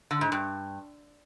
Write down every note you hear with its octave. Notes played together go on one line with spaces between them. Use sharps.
D3
G#2
G2